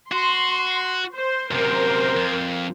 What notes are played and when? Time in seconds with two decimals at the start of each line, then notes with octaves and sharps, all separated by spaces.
0.12 F#4 C6
1.13 C5
1.51 F#2 C3 A#4 C5
2.16 F2